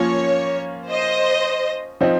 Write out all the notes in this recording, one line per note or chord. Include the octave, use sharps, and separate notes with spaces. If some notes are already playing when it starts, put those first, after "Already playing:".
Already playing: F3 A#3 C#4 F4 C#5
C5 D#5
F3 C4 D#4